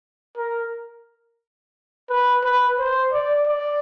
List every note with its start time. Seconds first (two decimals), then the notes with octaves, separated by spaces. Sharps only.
0.37 A#4
2.10 B4
2.44 B4
2.79 C5
3.13 D5
3.47 D5